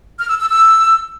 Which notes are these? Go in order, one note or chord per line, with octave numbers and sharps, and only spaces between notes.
F6
E6
E6
E6